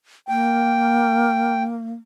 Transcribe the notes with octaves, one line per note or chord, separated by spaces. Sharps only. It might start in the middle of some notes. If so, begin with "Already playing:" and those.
A#3 G5